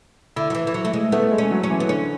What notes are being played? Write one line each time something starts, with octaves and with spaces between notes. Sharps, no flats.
D3 E4
F#3
E3
E3
F#3
A3
G#3
A3 B3
G#3
C#4
F#3
C#4
E3
B3
D3 C#4